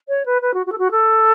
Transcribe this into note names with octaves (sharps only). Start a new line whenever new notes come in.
C#5
B4
B4
F#4
F#4
A4
F#4
A4